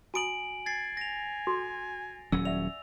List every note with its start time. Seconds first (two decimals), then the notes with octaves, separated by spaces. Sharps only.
0.14 F#4 G#5 A#5 D#6 D7 F#7
0.66 G#5 A6 C7
0.97 A#6 F7
1.47 F#4 A4 C6
2.32 D#1 F#3 C#4 E6
2.45 D5 E5 F#5 F7